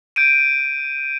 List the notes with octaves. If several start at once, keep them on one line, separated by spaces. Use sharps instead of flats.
G6 D7 D#7